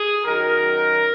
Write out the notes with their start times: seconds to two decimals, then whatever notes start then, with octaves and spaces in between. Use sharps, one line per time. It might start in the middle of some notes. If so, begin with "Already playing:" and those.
Already playing: G#4
0.25 F#2 D#3 F#3 A#4